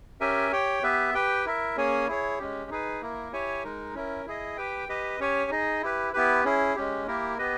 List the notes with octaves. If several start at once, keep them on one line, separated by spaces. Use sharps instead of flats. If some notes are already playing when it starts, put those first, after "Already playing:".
C#4 G4 A#4 E5 G#5
G4 C#5 G5
B3 G4 B4 E5
G4 B4 G5
E4 A#4 E5
A#3 C#4 G#4 C#5 G#5
E4 G#4 C#5
G#3 C#4 G4
D#4 G#4 B4
A#3 E4 A#4
E4 G4 C#5 G#5
G#3 D#4 A#4
C#4 E4 A#4
E4 G#4 D#5
G4 B4 G5
G4 B4 D#5
C#4 G4 C#5 G#5
D#4 G#4 D#5
E4 G4 B4
B3 E4 G4 B4
C#4 E4 G#4
G#3 C#4 G4
A#3 E4 G4 A#4
B3 G4 B4 D#5